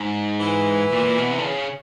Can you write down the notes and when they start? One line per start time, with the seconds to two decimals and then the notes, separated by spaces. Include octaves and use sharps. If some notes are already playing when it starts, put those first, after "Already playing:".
Already playing: G#2
0.40 E3
0.92 A#2
1.04 A#2
1.18 B2
1.31 C3
1.38 D3
1.44 C#3